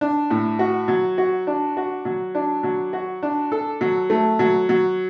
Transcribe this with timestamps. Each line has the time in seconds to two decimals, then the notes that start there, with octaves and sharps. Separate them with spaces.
0.01 D4
0.30 A2
0.59 F#4
0.88 F#3
1.18 F#4
1.47 D4
1.77 F#4
2.05 F#3
2.35 D4
2.63 F#3
2.93 F#4
3.23 D4
3.52 A4
3.81 F#3
4.10 A3
4.39 F#3
4.69 F#3